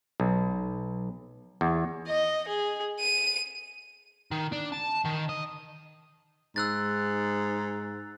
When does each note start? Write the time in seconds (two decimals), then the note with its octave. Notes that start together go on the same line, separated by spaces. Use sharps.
0.20 B1
1.61 E2
2.08 D#5
2.48 G#4
3.00 D#7
4.31 D#3
4.52 D4
4.72 A5
5.05 D#3
5.29 D#5
6.56 G#2 E6 F#6 A6